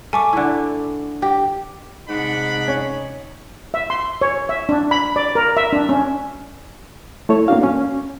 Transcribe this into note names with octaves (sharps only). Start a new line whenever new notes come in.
A3 G#5 C#6 D6
D3 E4
G4
G#2 C3 D4 D#4 F#5 B5
C#4
E5
C6
C#5
E5
D4
B5
D5
A#4
E5
D4
C#4
A3 E4 A4 C#5
A#3 B3 C#4 D4 F#4 F5
C#4